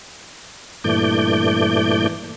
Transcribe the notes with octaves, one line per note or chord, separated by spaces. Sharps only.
G2 A#2 E3 A3 D5 G6